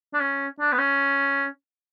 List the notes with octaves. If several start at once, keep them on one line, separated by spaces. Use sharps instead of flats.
D4
C#4
D4
B3
C#4